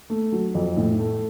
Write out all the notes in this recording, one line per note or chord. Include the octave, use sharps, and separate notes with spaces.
A3
F#3
F2
A2
A3